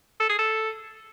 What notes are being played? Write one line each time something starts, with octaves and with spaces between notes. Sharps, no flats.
A4
G#4
A4